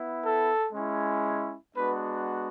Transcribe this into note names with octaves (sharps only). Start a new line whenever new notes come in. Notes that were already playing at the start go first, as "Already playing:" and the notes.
Already playing: B3 E4
A4
G#3 C#4 E4
G#3 B3 D4 F#4 B4